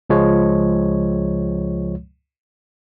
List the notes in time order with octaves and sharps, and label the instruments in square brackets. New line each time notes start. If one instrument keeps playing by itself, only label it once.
[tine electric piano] C#2 F3 G#3 C#5